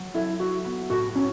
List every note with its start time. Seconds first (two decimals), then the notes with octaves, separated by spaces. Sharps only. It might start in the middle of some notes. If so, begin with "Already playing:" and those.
Already playing: F#3
0.14 E4 A4
0.40 E4 F#4
0.65 B3
0.90 A2 F#4
1.15 C#4 E4